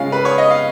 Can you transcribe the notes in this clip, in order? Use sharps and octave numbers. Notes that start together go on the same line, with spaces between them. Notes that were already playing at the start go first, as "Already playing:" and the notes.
Already playing: C#3 G#3 C#4 F4 F5
B4
C#5
D#5
F5